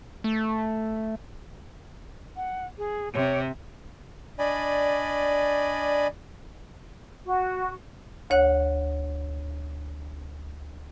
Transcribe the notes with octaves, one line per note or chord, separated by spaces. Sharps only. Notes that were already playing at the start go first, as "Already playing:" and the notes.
A3
F#5
G#4
C3 C#5
D4 D5 D#5 G#5 B5
F#4
D2 C#5 F#5 F#6